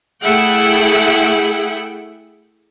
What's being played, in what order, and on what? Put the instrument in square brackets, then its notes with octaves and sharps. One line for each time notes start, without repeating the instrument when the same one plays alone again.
[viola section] A3 E4 G#4 E5 F#5 G5